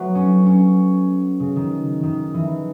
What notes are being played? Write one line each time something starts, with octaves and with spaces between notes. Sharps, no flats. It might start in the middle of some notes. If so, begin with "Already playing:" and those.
Already playing: F#3 A3 B3
C#4
C#4
C#3
D#3
D#3
E3